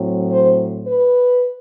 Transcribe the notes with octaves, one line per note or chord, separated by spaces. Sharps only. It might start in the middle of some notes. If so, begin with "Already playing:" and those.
Already playing: A2 F#3 C4
C5
B4